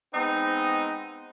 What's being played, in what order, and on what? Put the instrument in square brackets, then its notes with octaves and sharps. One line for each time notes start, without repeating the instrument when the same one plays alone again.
[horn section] G#3 B3 C4 D#4